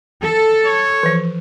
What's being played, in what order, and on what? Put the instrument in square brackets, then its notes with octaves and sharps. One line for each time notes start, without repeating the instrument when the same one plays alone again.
[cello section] A4
[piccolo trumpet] C#5
[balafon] E3 F3